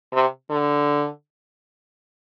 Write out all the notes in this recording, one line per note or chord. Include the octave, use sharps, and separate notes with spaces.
C3
D3